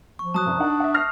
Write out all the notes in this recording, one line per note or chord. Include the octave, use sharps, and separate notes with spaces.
F3 C#6
F#3 A5 D#6 F#6
C2 F#2
D4 D#4 F#5
E5 F#5
F6 A#6 C7